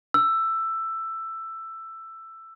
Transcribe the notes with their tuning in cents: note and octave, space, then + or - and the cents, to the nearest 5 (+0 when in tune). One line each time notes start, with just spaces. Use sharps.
E6 +10